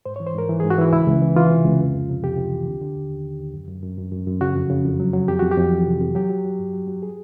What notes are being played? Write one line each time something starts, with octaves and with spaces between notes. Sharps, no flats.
G#2 C5
C#5
E3
C5
G#2 A#4
E3
G#4
G#2
F#4
E3 E4
C#2 E4
C#2
E3
E3 F4
C3
C#2
F2
F2
C3
F2 G4
C3
E3
D3
D3
D#2
D#2
D#2
D#2
F#2
F#2
F#2
F#2
F#2
F#2
C#3 F#4
F2
C#3
F2
F#3
F#3
F2 G4
F2 F#4
G4
F2
E3
C3
F2
F#3 G4
F#3
F#3
G2
F#3
F#3
G#4